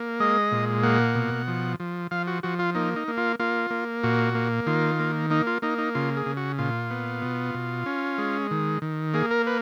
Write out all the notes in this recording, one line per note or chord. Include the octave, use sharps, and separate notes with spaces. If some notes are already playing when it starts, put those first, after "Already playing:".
Already playing: A#3
G#3 D#5
A#2
A#3 F#5
B2
F3
F3
F3 F5
F#4
F3 F#4
F4
A#3 D#4
D#4
A#3
F4
A#3 F4
A#3
A#2 F#4
A#3
D#3 F4
A#3
A#3 D#4
F4
A#3 D#4
D#4
C#3 F4
G#4
C#3
F#4
A#2 F4
B3
B2
B2
C#4
G#3
D#3
D#3
A#3 G#4
A#4
B4